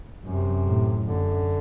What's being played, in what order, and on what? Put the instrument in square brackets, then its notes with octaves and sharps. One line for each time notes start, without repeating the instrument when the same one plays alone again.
[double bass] F#2 [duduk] C3
[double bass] A2
[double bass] F#2 [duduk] D3